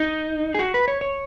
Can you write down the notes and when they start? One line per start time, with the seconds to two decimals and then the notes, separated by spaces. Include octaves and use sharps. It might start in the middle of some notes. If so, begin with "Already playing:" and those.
Already playing: D#4
0.54 G#4
0.59 F#4
0.74 B4
0.88 C#5
1.01 C#5